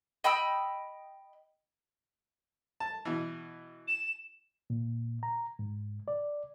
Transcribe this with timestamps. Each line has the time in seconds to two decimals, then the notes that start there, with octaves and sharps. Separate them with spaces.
0.24 D#5 G5 B5 E6
2.80 A5
3.05 B2 E3
3.87 E7
4.70 A#2
5.23 A#5
5.59 G#2
6.08 D5